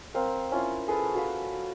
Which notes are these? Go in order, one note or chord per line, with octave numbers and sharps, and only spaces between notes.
C4 A#4 F5
C#4 E4 F4
G#4 A4 B4
F#4 A4 F5 B5